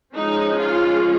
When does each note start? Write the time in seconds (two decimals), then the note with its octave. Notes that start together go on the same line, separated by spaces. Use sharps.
0.14 F3 G#3 C#4 D#4
0.59 F4